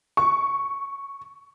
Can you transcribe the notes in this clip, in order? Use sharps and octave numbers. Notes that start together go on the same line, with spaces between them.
C#6